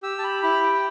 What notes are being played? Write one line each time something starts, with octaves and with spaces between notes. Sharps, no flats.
G4 E6
A5
B5
E4 B5
G5